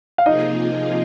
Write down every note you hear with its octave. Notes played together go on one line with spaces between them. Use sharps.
F5
C3 F3 A#3 D#4 F4 G#4 D#5